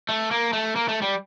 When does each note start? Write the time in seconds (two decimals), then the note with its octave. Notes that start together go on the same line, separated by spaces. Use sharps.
0.09 A3
0.31 A#3
0.53 A3
0.76 A#3
0.89 A3
1.02 G3